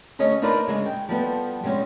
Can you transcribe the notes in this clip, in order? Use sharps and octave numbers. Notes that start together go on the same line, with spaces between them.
D2 C#4 G#4 C#5 D#5
D4 D#4 F4 A#4 B4 D5
C#3 G#3 E5 G#5
G5
F3 G3 B3 A4
C3 G3 G#3 C#4